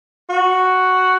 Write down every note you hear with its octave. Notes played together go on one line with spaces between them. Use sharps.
F#4